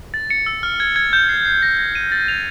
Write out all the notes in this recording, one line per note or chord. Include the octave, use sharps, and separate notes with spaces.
A6
C#7
E6
F6
G#6
G#6
G6
C7
C7
A#6
A#6
D#7
A6
F7